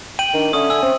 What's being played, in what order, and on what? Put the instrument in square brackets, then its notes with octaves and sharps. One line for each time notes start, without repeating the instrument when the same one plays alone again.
[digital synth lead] G5 [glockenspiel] D#7 F#7
[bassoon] D#3 [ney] D4
[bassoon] D3 [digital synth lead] C#4 [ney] E5 [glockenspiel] D#6
[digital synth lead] G#5 [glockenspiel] E6
[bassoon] C4 [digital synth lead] C#4